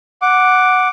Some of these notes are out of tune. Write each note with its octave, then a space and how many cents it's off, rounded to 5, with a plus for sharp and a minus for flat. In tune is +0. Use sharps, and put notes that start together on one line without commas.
F#5 -5 D6 +0